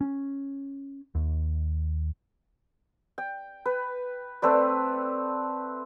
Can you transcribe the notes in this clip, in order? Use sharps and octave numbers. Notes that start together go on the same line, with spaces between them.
C#4
D#2
G5
B4
A3 C4 B4 D5